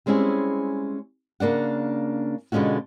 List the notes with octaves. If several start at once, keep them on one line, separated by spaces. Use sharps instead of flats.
G3 G#3 C4 C#4 E4 G#4
C#3 A#3 D4 F#5
B2 D3 G#3 C#4 F4 F#4